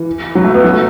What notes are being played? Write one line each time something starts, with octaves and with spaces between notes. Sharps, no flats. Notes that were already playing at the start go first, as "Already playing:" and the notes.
Already playing: E3
F#3
A3
B3
F#3
A3